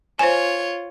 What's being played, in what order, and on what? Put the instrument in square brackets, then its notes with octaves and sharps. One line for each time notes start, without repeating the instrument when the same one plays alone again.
[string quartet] F4 C#5 [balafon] C5 G#5